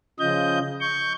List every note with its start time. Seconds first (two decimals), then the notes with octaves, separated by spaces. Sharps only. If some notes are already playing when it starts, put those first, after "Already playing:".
0.19 C#3 F3 D#5 G6
0.80 C#6 G6